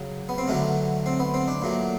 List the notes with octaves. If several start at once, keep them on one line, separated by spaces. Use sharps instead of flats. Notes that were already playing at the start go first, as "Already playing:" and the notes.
Already playing: C#3 F#3
B3
C4
D3 F#3 A3 C#4
C4
B3
C4
D4
A#2 F#3 A3